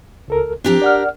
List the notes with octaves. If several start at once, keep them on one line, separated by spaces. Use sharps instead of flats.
C#2 A4 A#4
F3 C4 D4 G4 A#4
D5 F#5 F6